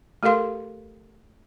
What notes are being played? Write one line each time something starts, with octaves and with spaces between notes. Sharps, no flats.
A3 G4 A4 A#4 F5 C6